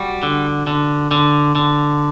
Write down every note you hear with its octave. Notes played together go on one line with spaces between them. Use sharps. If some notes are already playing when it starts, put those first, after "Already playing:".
Already playing: G3 F#4
D3
D3
D3
D3